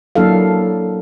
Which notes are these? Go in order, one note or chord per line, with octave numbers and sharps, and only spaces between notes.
F#3 A#3 D4 E4 A4 F5